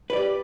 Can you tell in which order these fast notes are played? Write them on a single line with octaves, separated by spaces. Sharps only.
B4 D5 G4